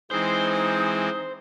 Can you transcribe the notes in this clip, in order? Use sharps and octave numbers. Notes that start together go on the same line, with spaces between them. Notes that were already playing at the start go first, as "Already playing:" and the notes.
E3 G#3 C4 D#4 C5 D#6